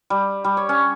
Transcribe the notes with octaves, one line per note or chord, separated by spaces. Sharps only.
G3
G3
C#5
C#4